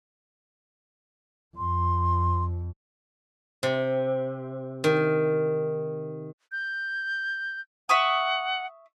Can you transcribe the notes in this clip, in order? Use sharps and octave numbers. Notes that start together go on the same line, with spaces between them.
F2 C6
C3
D#3
G6
E5 F#5 C#6 D#6